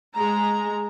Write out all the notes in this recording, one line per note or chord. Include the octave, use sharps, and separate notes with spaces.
G#3 A#5